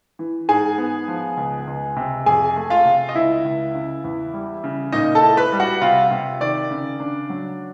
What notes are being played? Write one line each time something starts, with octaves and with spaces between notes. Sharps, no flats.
E3
G#2 G#4 G#5
B3
F3
C#2
C#2
C3
F2 G#4 G#5
A3
F4 F5
C3
D#5
C#2 E4 E5
C#2
C#3
E2
G3
C#3
A#2 D#4 D#5
A4 A5
E4
B4 B5
G3
F#4 F#5
C3 F4 F5
C3
D#3 D5
C#3
D4
F#3